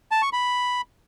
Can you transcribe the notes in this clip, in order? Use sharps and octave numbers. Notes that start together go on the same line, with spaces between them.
A5
C#6
B5